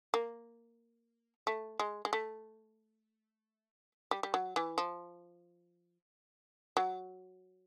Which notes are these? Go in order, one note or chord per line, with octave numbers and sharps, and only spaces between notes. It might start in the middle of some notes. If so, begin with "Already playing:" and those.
A#3
A3
G#3
G#3
A3
G3
G3
F#3
E3
F3
F#3